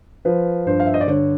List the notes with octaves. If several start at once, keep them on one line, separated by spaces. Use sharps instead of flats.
F3 B4
G2 C5
F5
E5
D#5
D5
D3 C#5